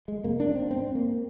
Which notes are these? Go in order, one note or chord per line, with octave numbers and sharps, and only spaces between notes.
G#3
F2 C3 A#3
D4
C4
G#2 C4
A#3